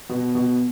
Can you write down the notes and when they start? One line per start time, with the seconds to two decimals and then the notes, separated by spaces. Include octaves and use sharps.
0.09 B2
0.35 B2